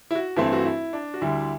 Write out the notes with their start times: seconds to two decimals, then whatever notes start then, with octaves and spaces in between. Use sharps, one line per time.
0.11 E4
0.15 F#4
0.36 G2 E3 A3 C4 E4
0.53 F#4
0.65 E4
0.93 D4
1.14 F#4
1.21 D2 D3 G3 E4